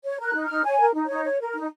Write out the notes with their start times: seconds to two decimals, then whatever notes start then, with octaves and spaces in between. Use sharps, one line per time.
0.05 C#5
0.20 A#4 F#6
0.34 D#4
0.45 F6
0.50 D#4
0.65 C#5 G#5
0.80 A#4
0.94 D#4
1.05 D#4 C#5
1.25 C#5
1.41 A#4
1.55 D#4